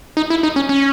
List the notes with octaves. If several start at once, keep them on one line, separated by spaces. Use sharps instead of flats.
D#4
E4
D#4
C#4
C#4